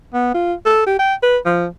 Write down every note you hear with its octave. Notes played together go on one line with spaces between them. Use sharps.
B3
F4
A4
G4
G5
B4
F3